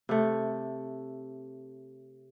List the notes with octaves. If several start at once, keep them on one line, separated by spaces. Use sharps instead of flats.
C3 A3